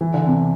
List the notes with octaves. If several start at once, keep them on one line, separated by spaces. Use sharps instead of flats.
E3
D3
C3